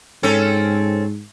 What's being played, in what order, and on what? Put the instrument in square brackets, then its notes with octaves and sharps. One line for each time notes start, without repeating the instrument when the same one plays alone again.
[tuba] G#2 [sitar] C4 C#4 A4